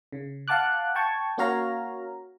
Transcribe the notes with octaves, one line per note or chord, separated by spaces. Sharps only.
C#3
F5 F#5 A5 D6 F#6
G5 A5 C#6 G#6
A#3 C#4 F#4 C#5 F5 A#5